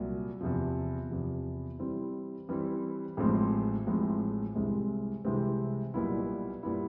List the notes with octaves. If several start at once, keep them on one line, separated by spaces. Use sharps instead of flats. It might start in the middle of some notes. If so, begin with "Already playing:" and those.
Already playing: C2 A#2 F#3
E2 C3 F3
E2 C3 F3
E3 G3 C4 E4
E3 G3 C4 E4
A1 A2 F3 G#3 C4
A1 A2 F3 G#3 C4
C2 C3 E3 G#3 C4
C2 C3 E3 G#3 C4
B1 A#2 G3 B3 E4
A#2 G3 B3 E4